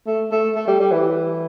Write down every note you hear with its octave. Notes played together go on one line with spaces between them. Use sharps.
A3
A3
A3
G3
G3
E3